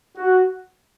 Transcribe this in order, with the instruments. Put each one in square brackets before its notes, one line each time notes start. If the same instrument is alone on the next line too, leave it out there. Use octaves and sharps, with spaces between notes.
[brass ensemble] F#4